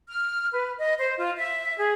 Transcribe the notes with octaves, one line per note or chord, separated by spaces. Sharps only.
F6
B4
D#5
C5
F4
E5
G#4